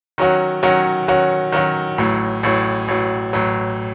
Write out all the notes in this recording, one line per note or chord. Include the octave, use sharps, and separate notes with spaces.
D#3 F#3 C#4 F#4
D#3 F#3 C#4 F#4
D#3 F#3 C#4 F#4
D#3 F#3 C#4 F#4
A1 A2 F#3
A1 A2 F#3
A1 A2 F#3
A1 A2 F#3